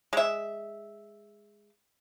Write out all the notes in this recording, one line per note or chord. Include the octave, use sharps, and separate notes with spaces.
G#3 E5